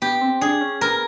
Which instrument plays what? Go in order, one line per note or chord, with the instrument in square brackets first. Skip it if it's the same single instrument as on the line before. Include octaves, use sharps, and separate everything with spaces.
[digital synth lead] B3 [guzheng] G4
[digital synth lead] C4
[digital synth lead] D4 [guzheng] G#4
[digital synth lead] C#4
[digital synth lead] B3 [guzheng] A#4